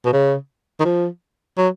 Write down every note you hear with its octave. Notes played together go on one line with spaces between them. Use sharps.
B2
C#3
D#3
F3
F#3